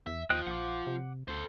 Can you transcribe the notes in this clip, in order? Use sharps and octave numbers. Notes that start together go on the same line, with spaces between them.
E2 E5
D#2 F3 D#5 G5 F#6
A#1 F#5 D6
C3
D2 A4 C5